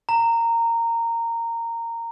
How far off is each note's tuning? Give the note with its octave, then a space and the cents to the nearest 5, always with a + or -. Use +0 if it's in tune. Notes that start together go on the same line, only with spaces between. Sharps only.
A#5 -15